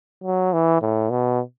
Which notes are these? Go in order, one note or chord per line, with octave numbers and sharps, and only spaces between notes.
F#3
E3
A2
B2